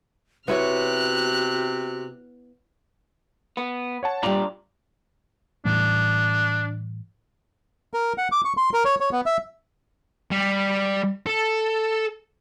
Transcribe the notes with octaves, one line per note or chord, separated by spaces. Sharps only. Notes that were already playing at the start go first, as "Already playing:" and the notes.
C3 B3 E4 F#4 C#5 F6 F#6
B3
C#5 F#5 A5
G2 A#2 G3 F4 D5 G5 A#5
A2 E3 G3 D4
A#4
F#5
D6
C#6
C6
A#4
C#5
C#5
B3
E5
G3
A4